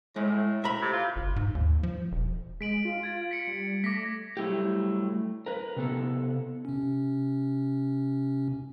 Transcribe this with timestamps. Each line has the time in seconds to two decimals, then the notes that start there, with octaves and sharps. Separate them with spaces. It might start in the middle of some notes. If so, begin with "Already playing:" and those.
0.16 A2 G#3
0.64 E5 A#5 B5
0.82 C3
0.93 F4
1.16 G1
1.36 G#2
1.55 D#2
1.83 F3
2.11 E1
2.61 G#3 B6 D7 F#7
2.85 F4
3.03 G#6 A6 D7
3.31 B6 C#7
3.48 G3
3.84 A3 D6 A#6 B6
4.37 F#3 G3 A3 E4 G4
5.46 A#4 B4
5.76 C3 B3 A4
6.65 C3 C#4